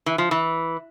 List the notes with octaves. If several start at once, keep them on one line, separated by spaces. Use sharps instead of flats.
E3
F3
E3